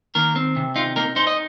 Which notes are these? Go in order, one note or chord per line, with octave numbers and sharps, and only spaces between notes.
D#3 A#3 A#4
C4
C3
D#4 F4
A#3 D#4 A#4
D#4 C5
D#5